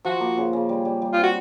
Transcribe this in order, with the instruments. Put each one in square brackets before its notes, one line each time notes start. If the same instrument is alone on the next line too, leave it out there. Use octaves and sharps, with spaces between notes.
[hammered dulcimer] F3 [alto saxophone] F#4
[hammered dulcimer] A#3
C#3
C#3
G3
G3
G3
[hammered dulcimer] C4 [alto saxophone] F4
[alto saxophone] F#4